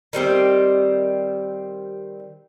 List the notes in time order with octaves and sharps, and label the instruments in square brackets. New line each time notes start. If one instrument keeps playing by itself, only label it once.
[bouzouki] D#3 G3 C4 G4